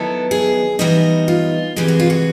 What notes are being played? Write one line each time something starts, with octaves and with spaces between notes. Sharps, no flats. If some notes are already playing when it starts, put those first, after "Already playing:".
Already playing: D#3 F#3 B3 E4 A4
G#4
E3 G3 B3 D#4 F#4
F4
C3 E3 G#3 G4
F#4
F4
F#4